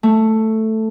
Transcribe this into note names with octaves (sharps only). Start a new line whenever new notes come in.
A3